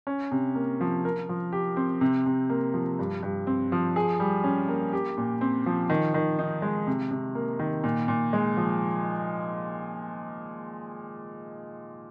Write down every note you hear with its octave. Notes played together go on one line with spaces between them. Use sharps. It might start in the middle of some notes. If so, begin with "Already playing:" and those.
C#4
C3
A#3
F3
A#4
F3
G4
C4
C3
C3
A#3
F3
G2
G2
C4
F3
G#4
G3
C#4
A#3
G4
A#2
C4
F3
D#3
D#3
D#4
G#3
C3
C3
A#3
D#3
A#2
A#2
G#3
F3